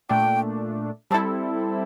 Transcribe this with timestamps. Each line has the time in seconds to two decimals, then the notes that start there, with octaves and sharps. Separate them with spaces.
0.09 A#2 A3 D4 G5
1.11 G3 C4 E4 A4 A5